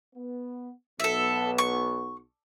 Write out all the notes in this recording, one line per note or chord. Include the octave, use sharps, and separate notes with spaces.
B3
B1 B3 A4 E5
C#6